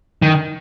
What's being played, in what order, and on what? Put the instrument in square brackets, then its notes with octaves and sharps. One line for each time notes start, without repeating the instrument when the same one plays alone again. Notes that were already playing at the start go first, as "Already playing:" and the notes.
[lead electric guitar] D#3